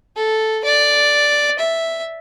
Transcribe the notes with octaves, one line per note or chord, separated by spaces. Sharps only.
A4
D5
E5